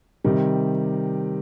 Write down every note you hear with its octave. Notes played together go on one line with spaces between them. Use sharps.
C3 D#3 G3